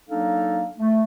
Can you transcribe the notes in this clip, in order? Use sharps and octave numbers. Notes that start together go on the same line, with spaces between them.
F#3 A#3 D4 D#4 A4 F5
A3